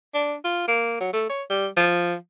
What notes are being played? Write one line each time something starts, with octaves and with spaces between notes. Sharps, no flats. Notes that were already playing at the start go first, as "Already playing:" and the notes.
D4
F4
A#3
F#3
A3
C#5
G3
F3